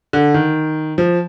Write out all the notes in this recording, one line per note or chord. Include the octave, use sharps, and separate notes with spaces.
D3
D#3
F3